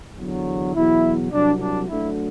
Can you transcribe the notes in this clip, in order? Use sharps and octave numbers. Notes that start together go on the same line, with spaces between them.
E2 D3 F#3
E2 B2 F#3 E4
C2 C3 F#3 D4
D4
D2 D3 F#3 E4